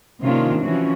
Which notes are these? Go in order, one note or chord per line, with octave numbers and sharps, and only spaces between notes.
C3 D#3 A#3 C#4 D4 F4
E3 F3 C#4 F#4